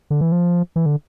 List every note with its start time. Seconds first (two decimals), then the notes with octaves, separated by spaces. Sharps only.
0.10 D3
0.21 E3
0.32 F3
0.76 E3
0.86 D3